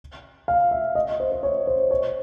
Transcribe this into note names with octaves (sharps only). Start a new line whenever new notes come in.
F5
E5
D#5
C5
C5
C#5
C5
C#5